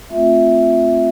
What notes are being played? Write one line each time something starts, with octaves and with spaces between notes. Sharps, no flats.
A3 C4 F4 E5